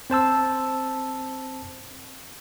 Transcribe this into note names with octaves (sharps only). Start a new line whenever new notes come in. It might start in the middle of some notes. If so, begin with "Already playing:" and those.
C4 C5 A5 E6